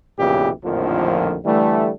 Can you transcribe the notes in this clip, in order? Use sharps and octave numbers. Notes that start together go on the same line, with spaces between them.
B1 F2 A#2 C#3 E3 G4
A#1 F2 A2 D3 D#3 F3
D3 E3 G3 A3